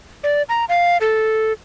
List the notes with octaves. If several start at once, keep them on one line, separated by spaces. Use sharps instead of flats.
D5
A#5
F5
A4